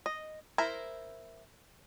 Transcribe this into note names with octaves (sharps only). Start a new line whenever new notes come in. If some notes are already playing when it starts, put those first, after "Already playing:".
D#5
E4 A#4 C5